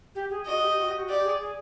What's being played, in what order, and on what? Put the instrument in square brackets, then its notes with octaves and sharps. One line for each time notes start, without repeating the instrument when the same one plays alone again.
[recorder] G4
G#4
[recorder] F#4 [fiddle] D#5
[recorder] G4
F#4
G4
F#4
[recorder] G4 [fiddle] D5
[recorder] G#4
G#4